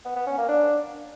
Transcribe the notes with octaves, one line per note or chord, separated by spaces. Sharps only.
B3
B3
C#4
A#3
D4